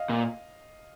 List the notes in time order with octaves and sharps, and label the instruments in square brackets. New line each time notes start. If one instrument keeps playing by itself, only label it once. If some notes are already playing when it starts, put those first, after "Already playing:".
Already playing: [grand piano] D#5 F5
[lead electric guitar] A#2